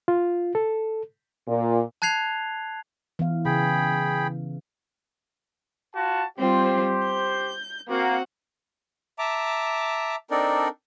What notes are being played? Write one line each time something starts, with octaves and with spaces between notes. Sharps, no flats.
F4
A4
A#2
A5 F#6 G#6 C7 F7
E3 B3 F5
C#3 G#4 G5 B5
F4 F#4 A5
G3 C4 F4 G4 C5
G6
A#3 C4 F#4 F#5
E5 A5 A#5 D6
C4 D4 D#4 A4 A#4 D5